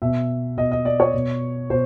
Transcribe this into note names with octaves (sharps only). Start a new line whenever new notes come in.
B2 E5
B2 D#5
D#5
D5
C#5
B2
B2 C5